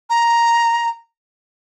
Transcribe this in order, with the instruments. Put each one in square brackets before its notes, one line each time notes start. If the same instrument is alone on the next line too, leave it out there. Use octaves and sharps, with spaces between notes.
[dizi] A#5